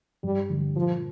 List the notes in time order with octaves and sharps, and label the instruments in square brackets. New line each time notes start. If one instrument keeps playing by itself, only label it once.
[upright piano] G2 [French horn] G3
[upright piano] D3 G3
[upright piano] A#2 [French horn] F3